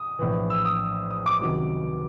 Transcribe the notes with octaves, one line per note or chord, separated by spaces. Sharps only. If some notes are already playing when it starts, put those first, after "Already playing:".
Already playing: D#6
A#1 A2 E3
E6
D#6
D#6
D6
C#2 C3 D#3 F#3